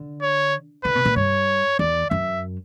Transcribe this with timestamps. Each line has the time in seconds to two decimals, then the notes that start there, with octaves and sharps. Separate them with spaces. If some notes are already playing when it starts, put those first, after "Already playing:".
Already playing: D3
0.22 C#5
0.84 D3 B4
0.95 B2
1.05 A#2
1.16 G2 C#5
1.79 E2 D5
2.10 F#2 E5